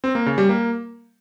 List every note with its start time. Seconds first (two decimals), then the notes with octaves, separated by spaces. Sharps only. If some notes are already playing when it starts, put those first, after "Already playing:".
0.04 C4
0.15 A#3
0.26 C#3
0.38 G3
0.49 A#3